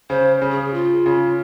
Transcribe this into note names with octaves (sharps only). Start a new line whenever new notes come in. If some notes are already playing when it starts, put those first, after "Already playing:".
C#3 C5
C#3
G#4
F4
C#3